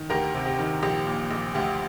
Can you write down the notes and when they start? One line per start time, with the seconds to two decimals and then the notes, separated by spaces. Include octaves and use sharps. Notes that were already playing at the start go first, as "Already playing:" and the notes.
Already playing: D#3
0.10 D2 G4 A#4
0.34 C3
0.46 G4
0.58 D#3
0.82 A#1 G4
1.07 A#2
1.31 A#1
1.55 D2 G4